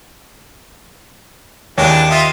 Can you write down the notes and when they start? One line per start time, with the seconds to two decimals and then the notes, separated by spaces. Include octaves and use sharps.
1.78 D#2 E3 D4 G#4
2.10 F4 D#5 E5